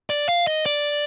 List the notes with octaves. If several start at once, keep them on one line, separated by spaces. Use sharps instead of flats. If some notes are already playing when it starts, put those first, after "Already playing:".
D5
F5
D#5
D5